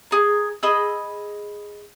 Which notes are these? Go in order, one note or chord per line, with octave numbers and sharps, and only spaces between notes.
G#4 A#4
G#4 D#5 B5 E6